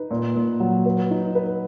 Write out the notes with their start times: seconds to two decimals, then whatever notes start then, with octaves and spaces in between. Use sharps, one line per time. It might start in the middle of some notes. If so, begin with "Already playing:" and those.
Already playing: D#4 B4
0.11 A#2
0.36 A#2
0.60 F#3
0.86 B4
1.11 D#4
1.35 B4